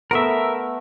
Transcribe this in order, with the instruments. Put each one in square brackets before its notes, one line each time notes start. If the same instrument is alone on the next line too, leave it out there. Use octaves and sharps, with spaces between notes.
[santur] A3 B3 [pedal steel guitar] A#4 E5